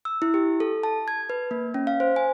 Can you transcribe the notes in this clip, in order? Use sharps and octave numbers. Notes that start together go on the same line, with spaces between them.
E6
E4
G4
A4
A5
G#6
B4
A#3
C#4
F5
C5
G#5